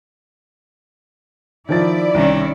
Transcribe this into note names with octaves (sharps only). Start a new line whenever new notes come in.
D#3 F3 E4 D5 A6
C2 D#3 C#4